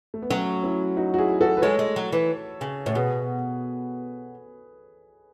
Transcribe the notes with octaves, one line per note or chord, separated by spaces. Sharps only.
A3
B3
F#3 A3 C#4
C#4 E4
D#4 F#4
F#4
E4 G#4
F#4 A4
B4
G#3 A4 C#5
G#3
F#3
E3
C#3
A2 C#5
B2 G#4 B4